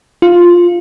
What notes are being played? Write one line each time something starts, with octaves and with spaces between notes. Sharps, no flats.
F4